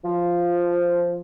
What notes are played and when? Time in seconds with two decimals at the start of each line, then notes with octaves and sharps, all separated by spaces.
0.05 F3